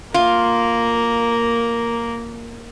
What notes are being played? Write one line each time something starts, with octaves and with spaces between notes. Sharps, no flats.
A#3 F4 A#4